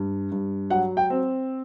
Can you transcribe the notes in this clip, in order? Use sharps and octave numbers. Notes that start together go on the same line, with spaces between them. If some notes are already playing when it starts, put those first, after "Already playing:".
Already playing: G2
G2
F#3 F#5
G5
C4